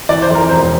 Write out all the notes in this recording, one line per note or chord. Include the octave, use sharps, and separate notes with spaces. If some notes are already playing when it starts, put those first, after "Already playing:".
E3 D5
C5
F2
A#4
E1 C5